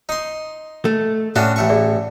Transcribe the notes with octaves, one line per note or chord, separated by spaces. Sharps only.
D#4 C6
A3
A2 C#4 D4 F#4 E5
A1 A3 A5 C#6
G#4 D5 E5